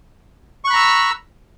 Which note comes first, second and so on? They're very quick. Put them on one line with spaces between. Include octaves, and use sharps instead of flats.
C#6 F#6 B5 A#5 E6